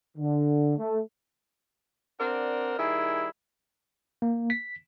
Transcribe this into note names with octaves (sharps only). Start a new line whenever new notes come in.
D3
A3
C4 D4 A#4 D5 F#5
D#3 G3 E4 G#4
A#3
B6